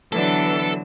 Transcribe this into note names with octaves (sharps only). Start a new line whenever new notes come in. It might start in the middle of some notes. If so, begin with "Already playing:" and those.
D3 E3 F#3 B3 D4 A4